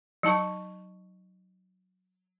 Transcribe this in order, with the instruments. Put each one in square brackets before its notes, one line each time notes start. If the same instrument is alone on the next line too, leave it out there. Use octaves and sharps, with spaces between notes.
[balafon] F#3 D#4 A5 C#6